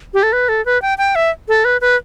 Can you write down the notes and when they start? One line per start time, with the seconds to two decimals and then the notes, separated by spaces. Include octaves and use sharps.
0.14 G4
0.23 A4
0.33 B4
0.49 A4
0.66 B4
0.82 G5
0.98 G5
1.15 E5
1.48 A4
1.65 B4
1.81 B4